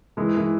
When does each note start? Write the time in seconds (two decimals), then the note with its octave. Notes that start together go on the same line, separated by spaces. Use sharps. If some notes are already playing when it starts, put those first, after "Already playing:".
0.17 E3 G#3
0.37 E3